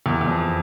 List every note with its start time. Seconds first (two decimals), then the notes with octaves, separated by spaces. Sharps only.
0.06 E2
0.21 E2
0.28 F2